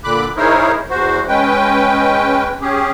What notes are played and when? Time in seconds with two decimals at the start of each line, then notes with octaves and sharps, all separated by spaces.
0.04 A#2 D3 B5 D6 F#6
0.37 D#4 E4 G#4 A#4 C5 C#5
0.90 E2 F#4 C5
1.28 G#3 C#4 B4 G5
2.61 C#4 G4 G#4